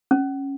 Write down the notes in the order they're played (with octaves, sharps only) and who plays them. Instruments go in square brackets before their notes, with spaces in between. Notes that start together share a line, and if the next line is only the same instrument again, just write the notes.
[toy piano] C#4